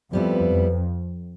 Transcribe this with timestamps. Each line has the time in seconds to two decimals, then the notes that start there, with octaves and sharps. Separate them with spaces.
0.13 F2 G3 B3 E4
0.52 F2